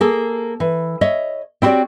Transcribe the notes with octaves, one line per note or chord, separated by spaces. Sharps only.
A#3 G#4 A4
E3
C#5 D#5 E5
C4 E4 F#4 G4 C#5 D5